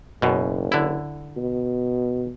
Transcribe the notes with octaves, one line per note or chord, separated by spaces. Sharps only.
F#1 F#2 B2
D3 E4
B2